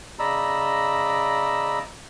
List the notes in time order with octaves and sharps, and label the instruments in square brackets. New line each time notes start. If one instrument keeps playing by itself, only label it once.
[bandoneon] C#3 D5 D#5 A#5 B5 E6